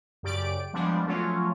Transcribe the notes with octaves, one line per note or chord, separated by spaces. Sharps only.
F#2 C#3 G4 D5 D7
F3 G3 G#3 B3 D4
F3 F#3 A3 C#4 F4